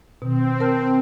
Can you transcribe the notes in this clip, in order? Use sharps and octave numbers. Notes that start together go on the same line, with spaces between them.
B2 D#3 C4
A#4 A5 F6